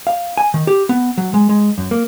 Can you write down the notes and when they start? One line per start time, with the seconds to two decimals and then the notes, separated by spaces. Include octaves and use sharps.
0.07 F5
0.37 G#5
0.54 D#3
0.67 G4
0.89 B3
1.18 F#3
1.34 G#3
1.49 G#3
1.78 F#2
1.91 A#3